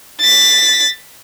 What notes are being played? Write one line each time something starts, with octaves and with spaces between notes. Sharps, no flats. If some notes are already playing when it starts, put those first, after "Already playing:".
A6 B6